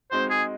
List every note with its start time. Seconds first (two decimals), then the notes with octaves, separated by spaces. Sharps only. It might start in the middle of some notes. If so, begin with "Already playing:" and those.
0.11 G#3 C4 D#4 F#4 C5
0.30 G#4